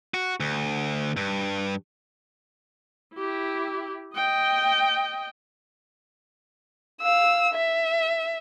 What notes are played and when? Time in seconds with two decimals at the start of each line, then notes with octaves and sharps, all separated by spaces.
0.14 F#4
0.40 D2
1.17 G2
3.15 E4 G4
4.15 D#5 G5
7.02 F5 E6
7.53 E5